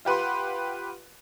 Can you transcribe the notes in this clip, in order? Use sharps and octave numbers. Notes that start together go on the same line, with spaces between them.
F4 G4 B4 F#5 C6